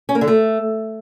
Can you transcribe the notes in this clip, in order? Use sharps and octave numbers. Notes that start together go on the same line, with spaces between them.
C#4
A#3
D3
A3